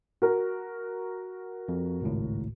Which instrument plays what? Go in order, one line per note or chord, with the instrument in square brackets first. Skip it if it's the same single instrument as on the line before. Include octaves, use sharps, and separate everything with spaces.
[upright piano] F#4 A#4
[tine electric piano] F2
G#1 C#2 A2